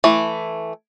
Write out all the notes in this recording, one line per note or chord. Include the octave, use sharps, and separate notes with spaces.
E3 A3